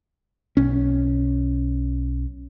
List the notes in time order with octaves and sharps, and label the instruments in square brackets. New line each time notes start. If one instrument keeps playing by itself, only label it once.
[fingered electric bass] B1 C#4